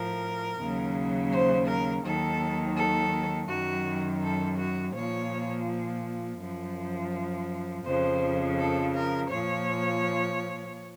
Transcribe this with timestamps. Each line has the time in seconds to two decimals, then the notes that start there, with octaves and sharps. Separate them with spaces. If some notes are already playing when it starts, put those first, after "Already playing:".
Already playing: A2 F3 A#4
0.59 D#2 C#3 F#3
1.31 C5
1.67 A#4
2.03 D#2 D#3 F#3 A4
2.76 A4
3.49 F#2 D#3 F#3 F#4
4.21 A4
4.58 F#4
4.94 A#2 F3 C#5
6.39 F#2 F3
7.85 F2 C#3 F3 C5
8.57 A4
8.94 A#4
9.30 A#2 F3 C#5